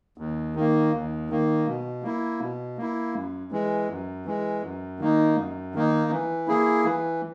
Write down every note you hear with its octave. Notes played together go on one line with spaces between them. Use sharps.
D#2
D#3 A#3
D#2
D#3 A#3
B2
A#3 E4
B2
A#3 E4
F#2
E3 G#3
F#2
E3 G#3
F#2
D#3 A#3 D#4
F#2
D#3 A#3 D#4
E3
A#3 E4 G#4
E3